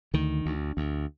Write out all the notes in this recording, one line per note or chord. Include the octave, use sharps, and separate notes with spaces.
D2 D#3
D2
D2